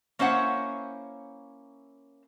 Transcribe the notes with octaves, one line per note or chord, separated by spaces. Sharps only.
A#3 C#4 E4 C5 C#5 F#5